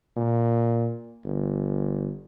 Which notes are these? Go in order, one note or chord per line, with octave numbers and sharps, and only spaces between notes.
A#2
G1